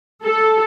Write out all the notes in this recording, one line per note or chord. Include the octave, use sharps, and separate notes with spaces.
A4